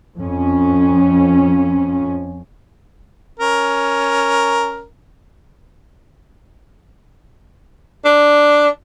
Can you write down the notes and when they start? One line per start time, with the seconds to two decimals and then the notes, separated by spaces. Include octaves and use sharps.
0.17 F2 C#4
3.40 C#4 A#4
8.05 D4